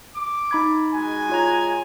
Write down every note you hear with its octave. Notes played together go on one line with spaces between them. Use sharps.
D6
D#4 B5 G#6
G#3 F#4 G#5
F4 C#5 A#5